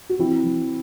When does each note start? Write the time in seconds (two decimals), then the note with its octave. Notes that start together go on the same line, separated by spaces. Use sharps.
0.09 F#4
0.19 E3 C4 E4
0.44 E3